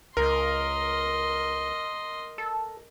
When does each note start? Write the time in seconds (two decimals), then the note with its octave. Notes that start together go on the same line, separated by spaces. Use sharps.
0.17 C#2 A#4 D#5 C6
2.38 A4